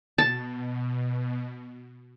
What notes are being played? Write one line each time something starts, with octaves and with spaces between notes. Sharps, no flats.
B2 A5